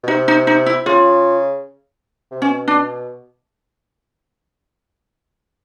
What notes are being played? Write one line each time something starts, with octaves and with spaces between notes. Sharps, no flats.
B2
C3 D#4
D#4
D#4
E4
C#3 F4
C3
B2 C#4
D4